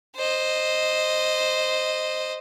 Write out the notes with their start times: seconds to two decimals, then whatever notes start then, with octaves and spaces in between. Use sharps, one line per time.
0.16 C5 D#5